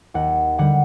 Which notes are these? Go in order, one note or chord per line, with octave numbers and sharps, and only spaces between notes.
D#2 F#5
D3 G3 F#5